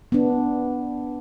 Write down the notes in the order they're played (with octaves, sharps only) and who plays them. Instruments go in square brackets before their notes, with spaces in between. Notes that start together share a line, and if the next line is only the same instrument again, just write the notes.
[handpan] B3 D4